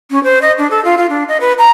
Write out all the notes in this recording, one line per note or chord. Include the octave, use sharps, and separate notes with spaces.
C#4
C5
D#5
D4
A4
F4
F4
D4
D#5
B4
A#5